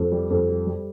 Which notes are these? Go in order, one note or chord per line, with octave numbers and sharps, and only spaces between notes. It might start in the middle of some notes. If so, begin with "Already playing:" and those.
Already playing: F2
G3
F2
G3
G3